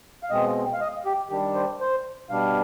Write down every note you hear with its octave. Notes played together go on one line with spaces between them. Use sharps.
F5
B2 G#3 C4 D#5
F5
D#5
G4
D#3 G3 D4 G4
C5
C5
B2 G3 D4 F5